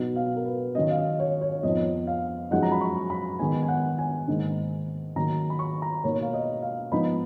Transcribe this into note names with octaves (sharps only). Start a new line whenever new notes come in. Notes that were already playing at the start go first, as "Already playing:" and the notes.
Already playing: B2 F#3 B3 D#4
F5
A#4
B4
D#3 F#3 C#4 D#5
F5
D#5
C#5
C#5
C#5
F2 F3 B3 D#4 D#5
F5
F#2 F3 G#3 D#4 F#5
A#5
B5
C#6
B5
D#3 G#3 B3 D#4 G#5
G#5
F#5
G#5
G#2 D#3 A#3 D#4
D#3 F#3 A#3 A#5
B5
C#6
A#5
B2 A#3 D#4 C#5
F5
D#5
F5
G#2 F3 B3 D#4 B5